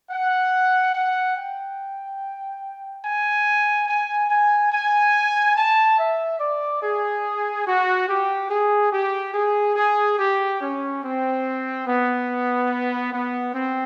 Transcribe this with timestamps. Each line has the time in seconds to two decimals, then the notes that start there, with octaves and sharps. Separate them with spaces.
0.10 F#5
0.94 F#5
1.35 G5
3.04 G#5
3.88 G#5
4.30 G#5
4.72 G#5
5.56 A5
5.98 E5
6.40 D5
6.82 G#4
7.66 F#4
8.08 G4
8.50 G#4
8.93 G4
9.34 G#4
9.76 G#4
10.19 G4
10.61 C#4
11.02 C4
11.87 B3
13.13 B3
13.54 C4